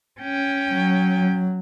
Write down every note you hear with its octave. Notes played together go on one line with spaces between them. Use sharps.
C#4 G5
F#3